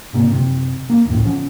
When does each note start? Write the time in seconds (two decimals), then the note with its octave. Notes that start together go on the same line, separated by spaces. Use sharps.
0.13 G#1 C3 A#3
0.31 F#1 C3
0.90 A#3
1.05 E1 C#2 A2
1.25 C#3 F3 B3 C#4